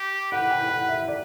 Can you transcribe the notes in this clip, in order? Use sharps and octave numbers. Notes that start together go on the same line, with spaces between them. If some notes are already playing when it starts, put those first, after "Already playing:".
Already playing: G4
B4 F#5
G5
F#5
E5
D5